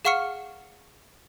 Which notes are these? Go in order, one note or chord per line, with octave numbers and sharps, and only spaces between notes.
G#4 F5 F#5 C#6 F6 C#7